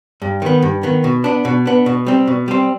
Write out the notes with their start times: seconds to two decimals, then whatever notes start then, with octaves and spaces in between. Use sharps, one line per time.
0.22 G2
0.42 D#3 B3
0.62 G2
0.83 D#3 B3
1.04 B2
1.24 B3 D4
1.45 B2
1.66 B3 D4
1.86 B2
2.06 G3 C4
2.27 B2
2.48 G3 C4